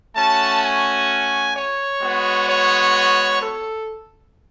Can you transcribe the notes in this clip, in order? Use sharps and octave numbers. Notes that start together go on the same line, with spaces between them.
A3 C#4 F#4 A5
G#5
C#5
G#3 B3 F#4
C#5
A4